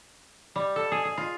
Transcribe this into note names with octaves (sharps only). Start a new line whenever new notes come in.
G3
A4
G#4
G#4
F4